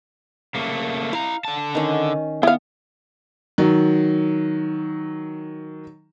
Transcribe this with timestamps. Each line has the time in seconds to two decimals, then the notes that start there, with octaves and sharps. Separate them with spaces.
0.55 C#3 A3 A#3
1.13 E4 F5 A#5
1.45 D3 A5
1.75 D#3 C#4
2.43 B3 E4 F5
3.58 D#3 F#3